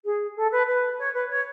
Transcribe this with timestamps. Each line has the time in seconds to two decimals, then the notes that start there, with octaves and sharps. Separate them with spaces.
0.05 G#4
0.36 A4
0.51 B4
0.67 B4
0.98 C#5
1.14 B4
1.29 C#5